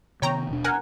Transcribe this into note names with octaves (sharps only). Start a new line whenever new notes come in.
C3 D#3 B3 C#5 G5 A#5
D#1 B2 D4
A#4 F#5 G#5